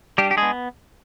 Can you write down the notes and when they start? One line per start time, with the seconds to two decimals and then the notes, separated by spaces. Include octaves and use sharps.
0.18 G3 D4 G4
0.31 G4
0.37 G#3 G#4
0.43 B3